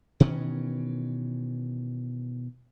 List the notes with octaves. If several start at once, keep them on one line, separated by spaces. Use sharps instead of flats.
B2 D#3 E3 C#4